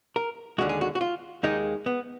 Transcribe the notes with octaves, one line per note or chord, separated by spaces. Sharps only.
A#4
D#2 D3 G#3 F#4
G#4
F#4
F#4
F4
D#2 D#3 G#3 D#4
B3